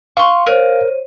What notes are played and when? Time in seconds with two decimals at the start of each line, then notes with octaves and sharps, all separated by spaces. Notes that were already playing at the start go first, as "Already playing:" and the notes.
0.17 F5 C6 C#6
0.46 A#4 C5 C#5 D#7